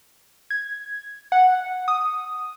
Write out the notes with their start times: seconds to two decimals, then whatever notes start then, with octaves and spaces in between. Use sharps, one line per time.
0.50 G#6
1.32 F#5
1.88 D#6